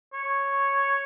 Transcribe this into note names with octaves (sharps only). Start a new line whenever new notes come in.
C#5